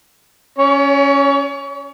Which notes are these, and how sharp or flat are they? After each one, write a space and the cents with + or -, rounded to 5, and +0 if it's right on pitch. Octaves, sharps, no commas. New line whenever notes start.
C#4 +0 C#5 +35